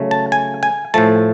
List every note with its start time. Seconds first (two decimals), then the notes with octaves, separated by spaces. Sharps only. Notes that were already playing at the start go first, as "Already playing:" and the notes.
Already playing: C#3 F#3 A3
0.11 A5
0.32 G#5
0.63 G#5
0.94 A2 F3 A3 A5